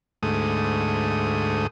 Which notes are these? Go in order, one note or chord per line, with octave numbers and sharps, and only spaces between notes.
D2 G#2 A3 D#6